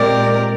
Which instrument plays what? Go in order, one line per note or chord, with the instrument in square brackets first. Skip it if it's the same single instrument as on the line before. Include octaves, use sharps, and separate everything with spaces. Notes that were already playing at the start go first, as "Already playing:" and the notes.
Already playing: [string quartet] A#2 G#3 C4 G4 A#4 [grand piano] D5